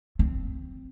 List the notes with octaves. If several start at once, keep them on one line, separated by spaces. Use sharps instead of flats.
C4